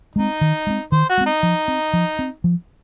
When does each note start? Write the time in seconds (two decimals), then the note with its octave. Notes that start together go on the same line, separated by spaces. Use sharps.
0.16 G#3 C4 D#4
0.41 D#3
0.67 G#3 C4
0.92 D#3 C5
1.09 F#4
1.18 G#3 C4
1.26 D#4
1.43 F3
1.68 C4
1.93 F3
2.19 C4
2.44 F3